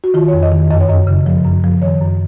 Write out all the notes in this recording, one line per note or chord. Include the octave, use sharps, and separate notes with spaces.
F#4
D#3 F4
C#5
F2
D#5
D#3
F#2 D#5
C#5
F#2 D#5
C#3
F3
F#2
F3
D#3 C#5
F#2